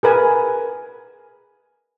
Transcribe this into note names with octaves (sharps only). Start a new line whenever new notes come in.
G#4 A#4 B4 G#5